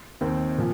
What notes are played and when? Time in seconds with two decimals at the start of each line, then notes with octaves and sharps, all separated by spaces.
0.21 D#2 D#3 C4
0.58 A#2 F3